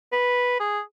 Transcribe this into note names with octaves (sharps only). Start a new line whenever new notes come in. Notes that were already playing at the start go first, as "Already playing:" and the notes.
B4
G#4